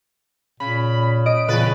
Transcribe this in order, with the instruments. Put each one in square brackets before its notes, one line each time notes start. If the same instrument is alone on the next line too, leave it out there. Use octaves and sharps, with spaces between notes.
[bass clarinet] A#2 [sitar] C#3 [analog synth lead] B5
[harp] D#5 [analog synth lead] D7
[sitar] E2 B4 [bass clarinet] A#2 [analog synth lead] C#3 [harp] F#6 A6